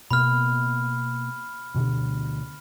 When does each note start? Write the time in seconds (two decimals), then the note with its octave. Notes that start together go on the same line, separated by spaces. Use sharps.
0.11 B2 A#3 B3 B5 F6
1.75 D2 B2 D3